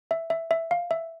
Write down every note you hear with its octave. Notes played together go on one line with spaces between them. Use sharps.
E5
E5
E5
F5
E5